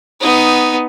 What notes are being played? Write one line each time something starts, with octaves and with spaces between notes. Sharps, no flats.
B3 D#4